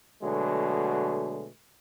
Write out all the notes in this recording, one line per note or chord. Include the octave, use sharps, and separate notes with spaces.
B2 D3 F#3 G#3 A3